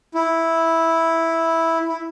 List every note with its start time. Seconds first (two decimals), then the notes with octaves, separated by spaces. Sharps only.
0.14 E4
1.88 E4